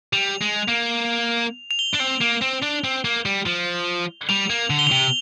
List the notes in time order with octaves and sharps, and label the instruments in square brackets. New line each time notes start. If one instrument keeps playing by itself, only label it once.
[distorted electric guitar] G3 [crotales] F7
[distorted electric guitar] G#3
A#3
[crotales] F7
G7
[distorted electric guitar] D4
C4
A#3
C4
D4
C4
A#3
G3
F3
[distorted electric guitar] G3 [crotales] F7
[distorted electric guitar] A#3
D3
[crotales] G7
F7
[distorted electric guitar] C3 [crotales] G7